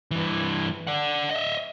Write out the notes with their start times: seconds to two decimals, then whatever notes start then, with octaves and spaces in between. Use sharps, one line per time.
0.11 G2 E3
0.87 D5 F#5
1.31 D#5 E5